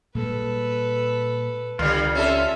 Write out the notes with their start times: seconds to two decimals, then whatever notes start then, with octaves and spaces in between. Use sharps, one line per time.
0.15 A#2 G3 G#3 A4 B4
1.79 C#2 D3 G3 F4
2.15 C#4 A4 E5